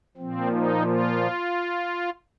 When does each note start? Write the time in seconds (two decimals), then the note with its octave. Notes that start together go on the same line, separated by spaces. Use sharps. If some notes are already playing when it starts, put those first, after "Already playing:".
0.17 A#2 F3 C4
0.52 D#4
0.86 F4